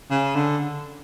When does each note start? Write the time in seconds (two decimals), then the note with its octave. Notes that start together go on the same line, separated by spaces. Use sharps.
0.11 C#3
0.35 D3